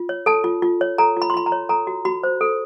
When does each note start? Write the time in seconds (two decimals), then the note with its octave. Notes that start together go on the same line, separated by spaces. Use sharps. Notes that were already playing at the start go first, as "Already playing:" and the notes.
Already playing: F4
0.09 C#5
0.26 A4 A5
0.44 F4
0.62 F4
0.81 C#5
0.98 A4 A#5
1.17 F4
1.22 B5
1.30 C6
1.34 F4 B5
1.46 A#5
1.52 C#5
1.69 A4 A#5
1.87 F#4
2.05 F#4 B5
2.23 C5
2.41 A4